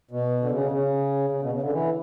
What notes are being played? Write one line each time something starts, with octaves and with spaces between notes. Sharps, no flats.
B2
D3
C#3
C#3
C#3
B2
C#3
D3
E3